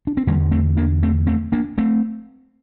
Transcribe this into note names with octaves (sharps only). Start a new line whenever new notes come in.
D4
C4
E2 D3 G3 A#3
A3 C4
A#3 D4
A3 C4
A3 C4
A#3 D4
A3 C4